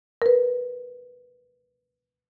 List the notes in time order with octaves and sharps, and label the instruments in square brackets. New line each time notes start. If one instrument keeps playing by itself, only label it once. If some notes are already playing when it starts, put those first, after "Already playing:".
[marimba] A#4 B4